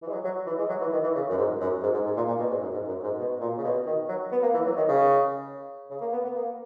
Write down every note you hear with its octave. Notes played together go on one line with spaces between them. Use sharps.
E3
G#3
F#3
F#3
E3
G#3
F#3
E3
D#3
E3
C#3
F#2
G#2
F#2
G#2
G#2
G#2
A#2
A#2
B2
G#2
F#2
G#2
F#2
G#2
B2
A#2
C#3
B2
D#3
F#3
B3
A#3
E3
F#3
D#3
C#3
C#3
A#3
B3
B3
A#3